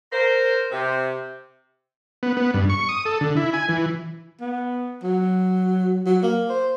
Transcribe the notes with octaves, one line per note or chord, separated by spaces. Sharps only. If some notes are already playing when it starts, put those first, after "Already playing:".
A#4 C5
C3
B3
B3
G2
C#6
D#6
A4
D3
E4
G#5
E3
B3
F#3
F#3
A#3
C5